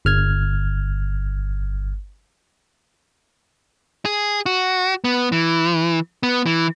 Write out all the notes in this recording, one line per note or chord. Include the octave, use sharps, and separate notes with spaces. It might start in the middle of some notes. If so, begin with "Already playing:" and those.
G1 F6 G#6
G#4
F#4
B3
E3
B3
E3